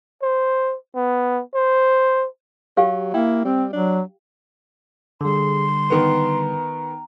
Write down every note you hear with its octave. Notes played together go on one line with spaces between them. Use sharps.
C5
B3
C5
F#3 G4 F5 G5
A#3 E4 G5
G3 C4
F#3 D4
D3 G3 G#4 C6
D#3 B3 A#5